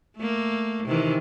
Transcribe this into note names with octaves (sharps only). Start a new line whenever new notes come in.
A3 A#3
C3 D#3 E3